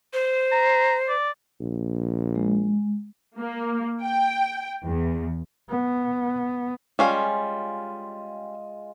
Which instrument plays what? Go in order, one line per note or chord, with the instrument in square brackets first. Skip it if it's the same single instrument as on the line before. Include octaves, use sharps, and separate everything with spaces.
[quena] C5
[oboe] A#5
D5
[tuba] A#1
[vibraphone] G#3
[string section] A#3
G5
E2
[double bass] B3
[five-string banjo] G3 C#4 F5 [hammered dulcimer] G#3 F4